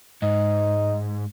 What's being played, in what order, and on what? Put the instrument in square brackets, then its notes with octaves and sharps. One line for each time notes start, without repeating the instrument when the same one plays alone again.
[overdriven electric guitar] G#2 [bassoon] D#4